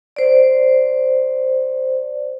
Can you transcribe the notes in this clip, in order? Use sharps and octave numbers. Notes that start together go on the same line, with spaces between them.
C5 D5